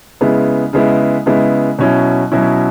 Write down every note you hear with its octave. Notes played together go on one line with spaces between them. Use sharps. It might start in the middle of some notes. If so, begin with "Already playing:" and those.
C#3 G#3 B3 E4
C#3 G#3 B3 E4
C#3 G#3 B3 E4
B2 F#3 C#4 E4
B2 F#3 C#4 E4